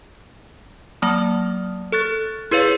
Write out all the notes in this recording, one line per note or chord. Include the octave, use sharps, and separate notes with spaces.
F#3 A#3 D5 A5 D#6 F6
A4 C#6 F#6 A6
E4 G#4 B4 C#5 F5